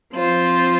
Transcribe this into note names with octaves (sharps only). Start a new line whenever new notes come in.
F3 C4 F4 C5